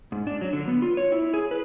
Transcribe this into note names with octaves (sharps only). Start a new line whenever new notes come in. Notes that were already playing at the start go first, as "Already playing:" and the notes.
G#2
D4
F#3
D3
B3
F4
C#5
E4
G#4
B4